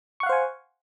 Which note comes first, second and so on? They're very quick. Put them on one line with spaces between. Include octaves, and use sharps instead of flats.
C#6 F#5 F5 C5 G#5